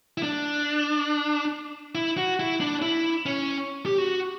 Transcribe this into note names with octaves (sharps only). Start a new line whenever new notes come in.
E4
D4
E4
F#4
E4
D4
E4
C#4
G4
F#4